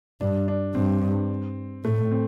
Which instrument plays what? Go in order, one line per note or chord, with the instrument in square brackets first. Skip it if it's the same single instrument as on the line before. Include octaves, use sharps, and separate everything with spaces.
[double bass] G2 [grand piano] D4
[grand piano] D4
[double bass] G2 [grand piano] C4
[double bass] A2 [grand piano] A3
[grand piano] C4